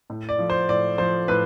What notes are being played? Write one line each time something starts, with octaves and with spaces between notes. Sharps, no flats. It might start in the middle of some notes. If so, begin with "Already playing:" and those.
A2
D5
F3
C5
A2 D5
F3 C5
A2 B4